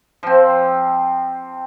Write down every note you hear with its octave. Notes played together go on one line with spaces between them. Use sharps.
F3 C4